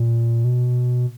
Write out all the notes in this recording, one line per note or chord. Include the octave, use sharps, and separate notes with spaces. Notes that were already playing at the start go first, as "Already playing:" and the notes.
Already playing: A#2
B2